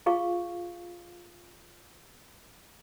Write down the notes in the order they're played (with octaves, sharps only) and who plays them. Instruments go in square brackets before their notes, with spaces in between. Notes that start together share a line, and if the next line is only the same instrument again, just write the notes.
[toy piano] F4 G#4 F5 C#6